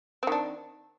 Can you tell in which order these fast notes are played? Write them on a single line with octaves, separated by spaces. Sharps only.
C4 D#3 D4